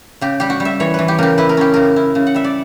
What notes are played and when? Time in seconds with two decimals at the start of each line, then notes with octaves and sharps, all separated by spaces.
0.21 C#3 G4
0.40 G3 G4
0.50 F#4
0.60 G3
0.65 E5
0.80 E3 C#5
0.94 E3 B4
1.08 G4
1.19 C#3 G4 A#4
1.38 E4 B4
1.49 A#4
1.57 C#4 G4
1.74 C#3 A#4
1.96 E4
2.15 C#3
2.27 F#5
2.35 G3 E5
2.44 D5